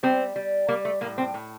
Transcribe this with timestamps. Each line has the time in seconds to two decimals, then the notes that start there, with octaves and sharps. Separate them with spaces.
0.03 G3 C4
0.36 G3
0.68 G3 A#3
0.85 A3
1.01 A2 A#3
1.18 C4
1.34 A2